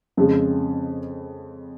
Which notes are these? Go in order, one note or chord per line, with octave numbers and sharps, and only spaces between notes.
F2 C#3 G#3